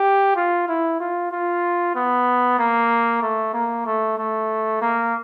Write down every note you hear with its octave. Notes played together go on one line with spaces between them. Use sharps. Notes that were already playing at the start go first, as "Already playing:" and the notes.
Already playing: G4
F4
E4
F4
F4
B3
A#3
A3
A#3
A3
A3
A#3